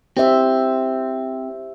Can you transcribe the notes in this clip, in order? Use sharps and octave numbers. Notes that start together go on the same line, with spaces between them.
C4 G4 C5 E5